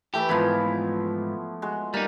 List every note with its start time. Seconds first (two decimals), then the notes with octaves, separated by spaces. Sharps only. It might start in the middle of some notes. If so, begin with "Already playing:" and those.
0.14 E3 A3 G4 E5
0.29 G#2 E3 F3 B3 E4
1.62 G#3 F#4
1.94 G3 A#3 D#4